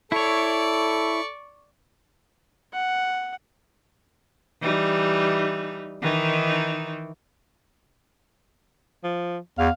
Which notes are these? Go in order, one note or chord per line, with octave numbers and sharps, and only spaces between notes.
E4 A4 C#5 D5 C#6
F#5
E3 G3 D#4
D#3 E3 D#4
F3
E2 F5